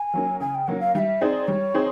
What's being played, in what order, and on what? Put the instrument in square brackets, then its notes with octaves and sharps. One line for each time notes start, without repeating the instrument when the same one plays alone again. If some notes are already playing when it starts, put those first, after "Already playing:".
Already playing: [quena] G#5
[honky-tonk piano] F#3 A#3 C#4
[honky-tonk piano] C#3 [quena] G#5
[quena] G5
[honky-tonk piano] F#3 A#3 C#4 [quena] F#5
[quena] F5
[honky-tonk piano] G3 [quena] F5
[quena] E5
[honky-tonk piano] C4 D#4 G#4 C5 [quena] D5
[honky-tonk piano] G3 [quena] C#5
[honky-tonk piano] C4 D#4 G#4 C5